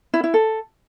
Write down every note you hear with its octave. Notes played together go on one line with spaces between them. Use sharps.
E4
E4
A4